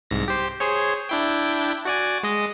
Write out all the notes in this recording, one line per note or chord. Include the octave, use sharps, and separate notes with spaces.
C2 G#2 A#6
G4 C5
G#4 C5 C#5
D4 E4 G5
F#4 D5 G#5
G#3 D#5